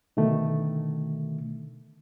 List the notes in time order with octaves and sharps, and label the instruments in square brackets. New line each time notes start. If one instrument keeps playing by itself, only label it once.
[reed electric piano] B2 D3 D#3 A3